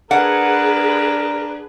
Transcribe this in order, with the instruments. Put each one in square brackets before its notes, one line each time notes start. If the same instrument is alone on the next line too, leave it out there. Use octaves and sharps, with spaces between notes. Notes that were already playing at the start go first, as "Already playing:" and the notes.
[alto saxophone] D4 [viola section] G#4 B4 [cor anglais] A#4 [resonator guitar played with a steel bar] F#5